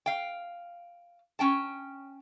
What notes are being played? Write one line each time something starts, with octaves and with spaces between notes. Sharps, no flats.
F5 G5
C#4 G5 A5